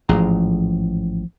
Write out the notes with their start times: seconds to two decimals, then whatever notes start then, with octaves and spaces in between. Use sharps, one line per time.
0.09 A1 G#2 F3 G#4 A#5